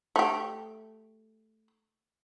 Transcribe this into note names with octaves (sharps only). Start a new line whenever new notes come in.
A3 G4